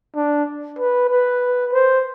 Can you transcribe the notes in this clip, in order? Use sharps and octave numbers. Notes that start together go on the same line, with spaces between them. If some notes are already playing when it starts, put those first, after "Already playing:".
D4
B4
B4
C5